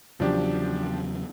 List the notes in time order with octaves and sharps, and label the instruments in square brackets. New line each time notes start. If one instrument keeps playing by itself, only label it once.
[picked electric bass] E2 C#3 F#3 [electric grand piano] F3 D4 G4